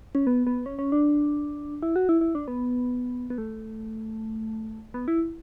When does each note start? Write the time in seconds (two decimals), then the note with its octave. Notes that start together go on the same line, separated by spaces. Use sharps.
0.15 C#4
0.27 B3
0.47 B3
0.66 C#4
0.79 C#4
0.92 D4
1.83 E4
1.96 F#4
2.09 E4
2.21 E4
2.35 D4
2.48 B3
3.30 B3
3.38 A3
4.94 B3
5.08 E4